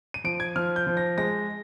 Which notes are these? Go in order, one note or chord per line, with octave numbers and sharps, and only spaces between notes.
D#7
F3 D7
G#6
F3 F6
G6
F3
A#6
G#3 A#6